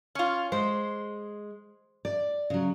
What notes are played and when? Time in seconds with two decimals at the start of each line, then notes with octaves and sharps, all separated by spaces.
0.15 C#4 F4
0.52 G#3 C5
2.05 D5
2.50 C#3 F#3